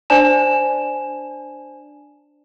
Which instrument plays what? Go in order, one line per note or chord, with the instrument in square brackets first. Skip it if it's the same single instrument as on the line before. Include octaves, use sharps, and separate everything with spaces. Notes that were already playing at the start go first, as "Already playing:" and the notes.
[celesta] D4 C5 D5 G#5 A5 E7